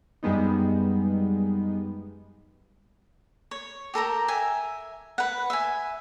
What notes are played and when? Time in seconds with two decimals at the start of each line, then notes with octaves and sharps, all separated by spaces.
0.23 F#2 G3 G#3 B3 D#4
3.51 C#5
3.94 G4 A4 A#4 A#5
4.28 E5 G#5
5.18 B4 F#5
5.50 E5 G#5